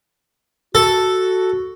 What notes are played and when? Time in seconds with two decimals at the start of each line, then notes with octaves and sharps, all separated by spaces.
0.75 F#4 A4